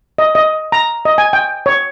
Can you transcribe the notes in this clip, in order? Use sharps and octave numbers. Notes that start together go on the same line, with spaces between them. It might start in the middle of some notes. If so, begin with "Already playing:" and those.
D#5
D#5
A#5
D#5
G#5
G5
C#5